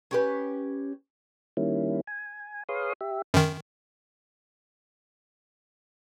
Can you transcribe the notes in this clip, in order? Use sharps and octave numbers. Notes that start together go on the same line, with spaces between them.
C#4 G4 B4
D#3 G3 A#3 C#4 E4
G#5
G#4 B4 C#5 F5 C6 D#6
G4 E5
F#2 D#3